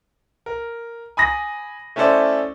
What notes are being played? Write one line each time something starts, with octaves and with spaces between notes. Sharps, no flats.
A#4
G#5 B5 D#6 A#6
A3 C#4 E4 A4 C5 D5